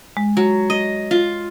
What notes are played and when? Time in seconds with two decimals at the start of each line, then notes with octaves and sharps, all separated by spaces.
0.17 G#3
0.37 F#3
0.70 D#5
1.11 F4